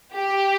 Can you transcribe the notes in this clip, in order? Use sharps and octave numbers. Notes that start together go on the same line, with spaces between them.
G4